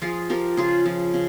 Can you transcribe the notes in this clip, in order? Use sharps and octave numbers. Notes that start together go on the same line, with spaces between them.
F3 F4 G#4
F3 G4 A#4
C#3 F4 G#4
F3
C#3